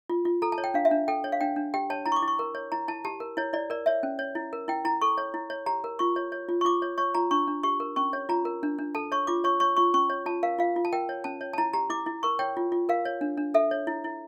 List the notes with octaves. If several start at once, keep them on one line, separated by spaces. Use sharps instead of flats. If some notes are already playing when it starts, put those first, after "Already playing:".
F4
F4
A4 A#5
A5
C#5
G5
D4 F5
E5
D4
A4 G5
C#5
F5
D4 G5
D4
G4 G5
C#5 A5
E4 A#5
C#6
D6
E4
C#6
A#4
C#5
E4 A#5
E4 A5
G4 A5
A#4
E4 C#5
E4 D5
A#4 D5
C#5 E5
C#4
C#5
E4
A#4
E4 G5
E4 A#5
A4 C#6
C#5
E4
C#5
G4 A#5
A#4
F4 C#6
C#5
C#5
F4
C#6
F4 D6
C#5
C#5 C#6
F4 A#5
D4 C#6
D4
G4 C#6
A#4
C#4 C#6
C#5
F4 A#5
A#4
D4
D4
A4 A5
C#5 C#6
F4 D6
C#5 C#6
C#5 C#6
F4 C#6
C#4 C#6
C#5
F4 A5
A#4 F5
F4 F5
F4
A5
A#4 G5
C#5
C#4 A5
C#5
A5
E4 A#5
G4 A#5
E4 D6
E4
A#4 C#6
C#5 G5
F4
F4
A#4 F5
C#5
D4
D4
A4 E5
C#5
E4
E4